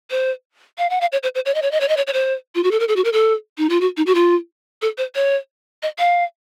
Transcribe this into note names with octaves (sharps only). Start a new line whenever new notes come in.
C5
F5
F#5
F5
C#5
C5
C5
C#5
D#5
C#5
D#5
C#5
D#5
C#5
C#5
C5
F4
F#4
A4
A#4
A4
F#4
A#4
A4
D#4
F4
F#4
D#4
F#4
F4
A4
C5
C#5
D#5
F5